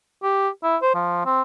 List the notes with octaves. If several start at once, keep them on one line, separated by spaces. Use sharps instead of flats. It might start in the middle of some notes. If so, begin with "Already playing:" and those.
G4
E4
C5
F3
C4